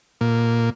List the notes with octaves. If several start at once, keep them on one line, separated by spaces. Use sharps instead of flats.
A#2